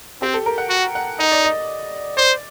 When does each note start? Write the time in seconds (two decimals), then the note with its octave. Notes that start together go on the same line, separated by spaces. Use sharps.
0.22 C4 G4
0.34 A4
0.46 A#4
0.58 F#5
0.70 F#4
0.95 F#5
1.19 D#4 D#5
1.32 D5
1.45 D#5
2.17 C5 D5